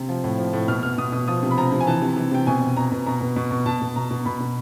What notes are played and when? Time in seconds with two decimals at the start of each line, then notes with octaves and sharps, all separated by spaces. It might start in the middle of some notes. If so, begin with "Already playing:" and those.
Already playing: C3
0.09 F3
0.24 A2
0.38 F3
0.53 A2
0.68 B2 F6
0.83 B2 F6
0.98 B2 D#6
1.12 B2 D#6
1.28 F3 D#6
1.42 C3
1.51 B5
1.58 F3 A#5
1.72 C3
1.80 G#5
1.87 E3 A5
2.02 C3
2.17 E3
2.31 C3 G5
2.47 B2 G#5
2.61 B2
2.77 B2 A#5
2.92 B2
3.06 B2 A#5
3.21 B2
3.36 B2
3.51 B2
3.66 B2 A5
3.81 B2
3.96 B2 A#5
4.11 B2
4.25 B2 B5
4.40 B2